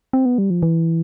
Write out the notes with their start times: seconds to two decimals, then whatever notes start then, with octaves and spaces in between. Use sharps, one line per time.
0.13 C4
0.26 B3
0.38 G3
0.50 F3
0.63 E3